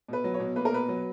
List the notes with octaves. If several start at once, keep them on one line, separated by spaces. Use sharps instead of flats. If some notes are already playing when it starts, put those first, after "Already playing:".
B2 B4
F#3
C#5
B2
A#3 B4
A#4
B2 B4
F#3